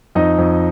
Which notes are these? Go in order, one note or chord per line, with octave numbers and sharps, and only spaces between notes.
F2 D#4 D#5
F2